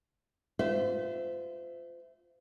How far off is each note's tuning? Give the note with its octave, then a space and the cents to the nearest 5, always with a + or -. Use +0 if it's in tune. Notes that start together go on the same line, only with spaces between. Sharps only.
F4 +0 C5 -35 E5 +0